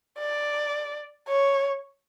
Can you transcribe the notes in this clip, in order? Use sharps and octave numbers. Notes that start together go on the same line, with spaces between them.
D5
C#5